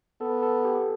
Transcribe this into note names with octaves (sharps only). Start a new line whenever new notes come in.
B3 A4
A4
G4